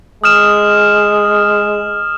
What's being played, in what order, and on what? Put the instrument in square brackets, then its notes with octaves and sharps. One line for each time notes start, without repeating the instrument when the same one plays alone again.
[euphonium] G#3 [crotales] D#6 F6 E7